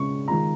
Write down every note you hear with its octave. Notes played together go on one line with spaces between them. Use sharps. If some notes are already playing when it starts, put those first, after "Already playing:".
Already playing: C#3 G#3 C#6
D#3 G#3 F4 A#5